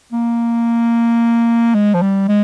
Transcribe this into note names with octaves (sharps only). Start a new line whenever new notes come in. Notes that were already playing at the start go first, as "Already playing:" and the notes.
A#3
G#3
F3
G3
G#3